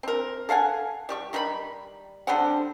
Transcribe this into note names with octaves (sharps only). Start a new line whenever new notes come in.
C4 A#4
A4 F5 F#5 G#5
G3 G4 C#6
D#3 G3 D#4 B5
D3 G3 C4 F#5